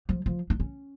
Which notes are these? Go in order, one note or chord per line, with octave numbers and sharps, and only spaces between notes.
F3
F3
D4
C#4